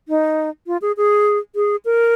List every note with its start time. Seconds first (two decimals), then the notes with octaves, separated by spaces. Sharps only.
0.08 D#4
0.67 F4
0.82 G#4
0.97 G#4
1.55 G#4
1.85 A#4